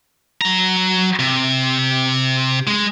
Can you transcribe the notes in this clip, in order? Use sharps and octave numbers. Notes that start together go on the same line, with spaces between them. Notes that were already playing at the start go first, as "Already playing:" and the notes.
F#3 A#5
C3
G#3